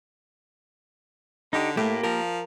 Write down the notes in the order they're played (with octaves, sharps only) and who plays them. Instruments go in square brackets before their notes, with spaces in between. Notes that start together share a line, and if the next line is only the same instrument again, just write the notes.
[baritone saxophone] D3 [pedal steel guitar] D#4 G4
[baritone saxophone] A2 [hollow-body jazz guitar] A3 [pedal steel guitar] A#3 G4
[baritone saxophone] F3 [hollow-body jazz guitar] A#4